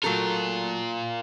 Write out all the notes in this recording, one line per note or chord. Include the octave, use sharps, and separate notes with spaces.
F#3 A3 F4 A4 A#4